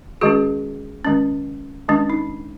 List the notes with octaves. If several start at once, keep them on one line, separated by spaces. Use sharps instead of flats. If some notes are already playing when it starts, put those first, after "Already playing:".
D#3 G#3 C#4 F#4 G#4
D#3 G#3 C#4
D#3 G#3 C#4 D4
D#4